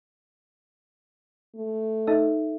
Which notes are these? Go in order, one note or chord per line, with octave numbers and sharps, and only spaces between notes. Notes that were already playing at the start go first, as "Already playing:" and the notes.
A3
D#4 A4 E5